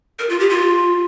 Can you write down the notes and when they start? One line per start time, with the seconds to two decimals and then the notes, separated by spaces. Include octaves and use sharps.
0.19 A#4
0.29 F4
0.40 G4
0.50 F4